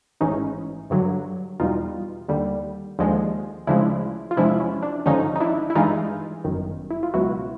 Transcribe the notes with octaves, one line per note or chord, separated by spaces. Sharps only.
A1 G#2 E3 C#4 D#4
G2 D3 F#3
E2 B2 G3 D#4 F4
D#2 D3 G3
D#2 D3 F3 G#3
D2 C#3 F3 G#3 D4 E4
F4
E2 C3 F3 G#3 D4 E4
C#4
D4
G#1 G2 D3 F3 C#4 D#4
D#4
D4 E4
E4
G2 E3 G#3 D#4 F4
G1 F#2 D#3
E4
F4
C#2 B2 F#3 E4 F#4